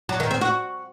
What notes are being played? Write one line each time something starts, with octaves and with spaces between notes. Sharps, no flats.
F#3
D#3
C4
F#4